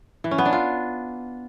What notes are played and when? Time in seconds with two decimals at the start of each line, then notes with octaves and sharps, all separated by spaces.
0.24 E3
0.31 C#4
0.38 B3
0.46 D4
0.53 F4